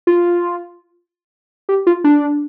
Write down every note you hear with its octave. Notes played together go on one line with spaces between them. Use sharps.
F4
G4
F4
D4